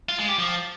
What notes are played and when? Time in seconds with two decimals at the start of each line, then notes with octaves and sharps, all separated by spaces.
0.09 F4
0.19 G#3
0.28 G4
0.38 F3